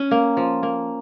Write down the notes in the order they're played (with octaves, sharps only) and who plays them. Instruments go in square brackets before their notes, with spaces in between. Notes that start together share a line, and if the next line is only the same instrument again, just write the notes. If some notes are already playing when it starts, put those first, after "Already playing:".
Already playing: [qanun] C#4
[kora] A#3
F3
A#3